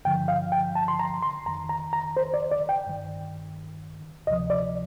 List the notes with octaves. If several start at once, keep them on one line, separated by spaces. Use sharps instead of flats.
G2 D3 F3 G5
F5
G5
A5
C6
A#5
C6
F2 D#3 A#5
A#5
A#5
C5
D5
D5
G5
G2 D#3
D2 C3 F3 D#5
D5